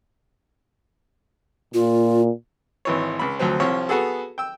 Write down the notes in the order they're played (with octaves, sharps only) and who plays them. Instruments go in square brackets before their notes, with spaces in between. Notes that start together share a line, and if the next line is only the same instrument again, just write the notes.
[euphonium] A#2 [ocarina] F4
[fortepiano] G#1 E3 C#5
C#2 B5
D2 F3 F#3 C4
C2 F3 C#5
B3 F#4 G#4 A4
G5 E6